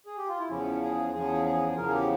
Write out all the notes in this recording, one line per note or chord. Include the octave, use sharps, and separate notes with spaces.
G#4
G4
F4
E4
E2 C#3 F3 C#4
G#4
E2 C#3 F3 G#4
G#4
G#4
E2 C#3 F3 A#4
G#4
G4